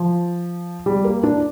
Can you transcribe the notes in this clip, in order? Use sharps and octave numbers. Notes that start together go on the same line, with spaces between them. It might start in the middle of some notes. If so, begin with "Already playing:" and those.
Already playing: F3
G3
A#3
D4